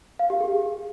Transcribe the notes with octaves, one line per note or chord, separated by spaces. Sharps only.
F5
G4
G#4